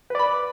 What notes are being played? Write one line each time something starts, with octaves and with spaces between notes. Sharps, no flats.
B4 D5 B5